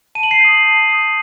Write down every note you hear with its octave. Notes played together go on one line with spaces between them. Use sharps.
A5 D#7
F#7
C7 D#7
D#6 G6
A5
D#6 G6